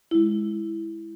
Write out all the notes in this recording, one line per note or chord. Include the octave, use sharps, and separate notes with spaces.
G#3 E4